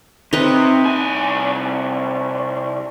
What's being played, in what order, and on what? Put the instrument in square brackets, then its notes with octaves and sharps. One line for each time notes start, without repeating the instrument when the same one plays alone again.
[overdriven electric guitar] C3 C4 [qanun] D#4 B4
[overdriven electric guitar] C2 G#5